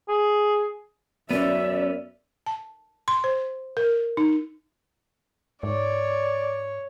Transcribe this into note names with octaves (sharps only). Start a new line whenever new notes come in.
G#4
F#2 B3 C#4 D5 E5
A5
C6
C5
A#4
D#4
G#2 C#5 D5